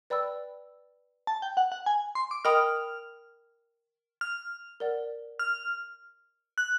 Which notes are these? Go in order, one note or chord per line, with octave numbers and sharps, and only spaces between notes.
B4 D5 G5 B5 E6
A5
G5
F#5
F#5
G#5
C6
D6
A#4 D#5 G5 B5 D#6 F6
F6
A#4 D5 F#5
F6
F#6